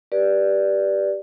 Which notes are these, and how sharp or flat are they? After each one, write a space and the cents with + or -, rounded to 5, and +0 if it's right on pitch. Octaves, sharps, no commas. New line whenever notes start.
G4 +0 B4 -25 D5 +0